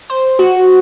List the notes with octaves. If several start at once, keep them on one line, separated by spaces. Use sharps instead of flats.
C5
F#4